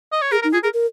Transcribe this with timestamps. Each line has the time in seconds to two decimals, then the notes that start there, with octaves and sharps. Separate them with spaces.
0.12 D#5
0.22 C#5
0.31 G#4 A#4
0.42 D#4 A#4
0.53 F4 G#4
0.64 G#4 A#4
0.74 A#4